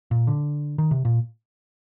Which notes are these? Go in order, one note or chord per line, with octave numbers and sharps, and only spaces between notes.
A#2
D3
D#3
C3
A#2